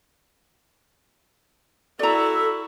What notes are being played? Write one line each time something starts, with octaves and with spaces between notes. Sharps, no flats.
E4 F#4 A4 D5 A#5